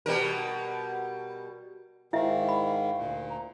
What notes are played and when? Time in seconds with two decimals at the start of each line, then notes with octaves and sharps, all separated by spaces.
0.06 B2 G3 A#4
2.13 G#2 D#3 E4 E5 F5
2.49 B5
2.98 D2 A#2
3.30 A#5